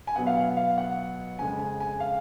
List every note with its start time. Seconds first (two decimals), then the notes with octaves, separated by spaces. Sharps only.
0.07 G#5
0.16 B2 F#3 B3 F#5
0.27 F5
0.37 F#5
0.57 F5
0.78 F#5
1.39 F2 C#3 G#3 G#5
1.59 G#5
1.80 G#5
2.00 F5